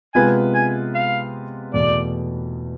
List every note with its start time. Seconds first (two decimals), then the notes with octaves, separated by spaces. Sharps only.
0.14 C3 G#3 B3 F4 B4 G#5
0.54 G#5
0.95 F5
1.74 E2 B2 A3 D5